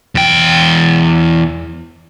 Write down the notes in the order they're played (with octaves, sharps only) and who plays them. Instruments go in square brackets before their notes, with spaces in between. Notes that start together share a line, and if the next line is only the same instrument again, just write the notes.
[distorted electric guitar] E2 G5